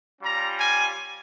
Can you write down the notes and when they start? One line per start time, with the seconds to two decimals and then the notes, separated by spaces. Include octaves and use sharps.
0.22 G3 C#4 F4 A#5
0.58 G#5